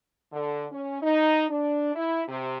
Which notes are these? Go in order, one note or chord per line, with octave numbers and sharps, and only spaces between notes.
D3
C#4
D#4
D4
E4
C3